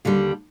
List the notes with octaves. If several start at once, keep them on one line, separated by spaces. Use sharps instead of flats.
D#2 D3 G3